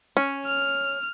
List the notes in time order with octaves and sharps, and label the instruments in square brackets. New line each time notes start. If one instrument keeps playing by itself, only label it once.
[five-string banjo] C#4
[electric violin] F6